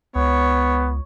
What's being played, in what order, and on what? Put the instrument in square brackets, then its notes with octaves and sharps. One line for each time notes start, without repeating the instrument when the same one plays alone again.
[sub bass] C#2 [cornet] B3 [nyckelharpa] C#5